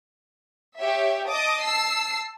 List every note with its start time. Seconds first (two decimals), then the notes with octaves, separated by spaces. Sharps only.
0.78 G4 C#5 E5
1.29 D#5 A5 D6 D#6
1.63 A5 E6 C7